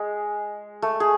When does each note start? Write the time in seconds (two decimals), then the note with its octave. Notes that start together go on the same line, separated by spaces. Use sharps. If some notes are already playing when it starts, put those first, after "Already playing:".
Already playing: G#3
0.82 A3
1.00 G#4